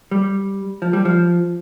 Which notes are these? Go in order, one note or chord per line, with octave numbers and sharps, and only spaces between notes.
G3
F3
G3
F3